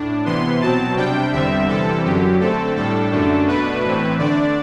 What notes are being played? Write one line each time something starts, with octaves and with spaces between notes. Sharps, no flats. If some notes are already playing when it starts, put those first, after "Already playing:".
Already playing: A2 D4
C3 E3 B3 C6
B2 F#3 C4 A5
C3 G3 D4 G5
E2 D3 G3 C4 E5
C3 E3 G3 C4 A4
F#2 D3 F#3 G4
D3 A3 C4 A4
A2 G3 D4 A4
F#2 D3 A3 D4
B2 A3 D4 B4
A2 E3 A3 C4
D3 A3 D4 D5